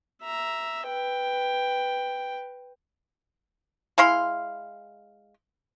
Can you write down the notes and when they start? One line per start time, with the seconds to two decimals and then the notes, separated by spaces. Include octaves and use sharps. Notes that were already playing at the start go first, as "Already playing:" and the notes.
0.22 E5 A#5
0.87 B4 G5
3.98 G#3 E4 F5 C6